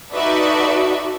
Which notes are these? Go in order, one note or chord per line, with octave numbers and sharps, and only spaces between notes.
D#4 F#4 A4 B4 D5 E5